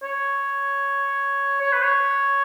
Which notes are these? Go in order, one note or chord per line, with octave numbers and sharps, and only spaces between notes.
C#5
C#5
B4
C#5